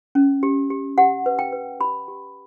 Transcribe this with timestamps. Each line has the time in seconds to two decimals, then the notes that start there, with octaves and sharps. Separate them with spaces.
0.15 C#4
0.43 G4
0.70 G4
0.98 G4 F#5
1.26 B4
1.39 G5
1.53 B4
1.80 G4 B5
2.08 G4